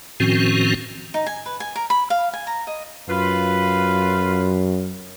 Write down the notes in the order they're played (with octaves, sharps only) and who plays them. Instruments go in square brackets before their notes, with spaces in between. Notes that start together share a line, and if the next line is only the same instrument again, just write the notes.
[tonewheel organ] A2 D#3 F3 C4 C#4 F#4
[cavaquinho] D#4
G#5
B4
G#5
A#4
B5
F5
G#5
A#5
D#5
[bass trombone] F#2 [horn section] F4 B4